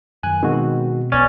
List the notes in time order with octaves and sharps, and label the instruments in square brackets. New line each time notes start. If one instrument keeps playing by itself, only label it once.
[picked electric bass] F#2 D#3 [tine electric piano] G#5 F#6
[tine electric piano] B2 [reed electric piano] D#3 G#3 F#4 [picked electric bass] C4
[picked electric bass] D1 B1 B3 [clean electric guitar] C#4 [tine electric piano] D5 [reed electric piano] A6